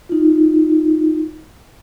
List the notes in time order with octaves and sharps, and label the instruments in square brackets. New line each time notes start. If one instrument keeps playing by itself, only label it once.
[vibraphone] D#4 F4